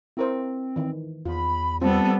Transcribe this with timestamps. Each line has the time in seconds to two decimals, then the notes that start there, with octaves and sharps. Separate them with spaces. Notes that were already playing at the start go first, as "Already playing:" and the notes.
0.17 C4 E4 A#4 C5
0.76 D#3 E3
1.26 E2 F4 B5
1.81 G3 B3 C4 F4 A4